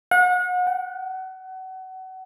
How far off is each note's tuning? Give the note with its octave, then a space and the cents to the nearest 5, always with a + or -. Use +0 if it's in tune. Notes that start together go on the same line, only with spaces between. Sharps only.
F#5 -35
F#5 +30